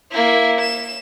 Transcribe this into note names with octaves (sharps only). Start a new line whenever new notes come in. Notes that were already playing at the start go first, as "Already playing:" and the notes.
A#3 E4
E7